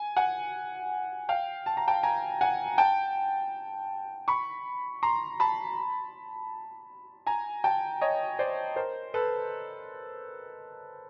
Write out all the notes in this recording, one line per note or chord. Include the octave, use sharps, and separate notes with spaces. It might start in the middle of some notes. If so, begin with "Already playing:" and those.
Already playing: G#5
F#5 G#5
F5 G5
A5
A#5
G5 A5
G#5 A#5
F#5 G#5
G5 A5
B5 C#6
A#5 C6
A5 B5
G#5 A#5
G5 A5
C#5 D#5
C5 D5
A#4 C5
A4 B4